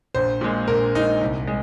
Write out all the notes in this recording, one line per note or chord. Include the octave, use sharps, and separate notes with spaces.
A#1 C5
A#2 G#3
A#1 A#4
A#2 G#3 D#4
C2
G#3